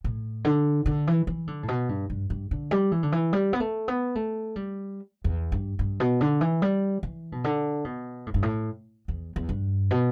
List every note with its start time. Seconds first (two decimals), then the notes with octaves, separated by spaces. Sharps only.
0.04 A2
0.45 D3
0.86 D3
1.07 E3
1.27 E3
1.47 D3
1.63 A2
1.68 B2
1.89 G2
2.10 G2
2.30 G2
2.51 D3
2.71 G3
2.92 E3
3.03 D3
3.12 E3
3.33 G3
3.53 B3
3.60 A3
3.88 B3
4.15 A3
4.56 G3
5.24 E2
5.52 G2
5.79 G2
6.00 B2
6.21 D3
6.41 E3
6.62 G3
7.03 E3
7.32 B2
7.44 D3
7.85 B2
8.26 A2
8.34 G2
8.43 A2
9.08 E2
9.36 E2
9.49 G2
9.91 B2